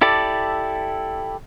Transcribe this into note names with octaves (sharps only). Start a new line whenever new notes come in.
E4 G4 A4 D5 A5